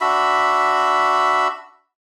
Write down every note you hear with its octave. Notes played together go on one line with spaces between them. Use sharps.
D4 F#4 E5 B5